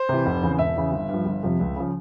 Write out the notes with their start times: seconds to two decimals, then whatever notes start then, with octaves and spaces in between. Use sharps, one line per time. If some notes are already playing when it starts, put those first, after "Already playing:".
Already playing: C5
0.09 C3 E3
0.26 F1
0.42 E2 C#3
0.59 E1 E5
0.76 E2 C#3
0.92 G1
1.09 G2
1.14 F3
1.26 G1
1.43 F2 C3 F3
1.59 C#2
1.76 C#3 F3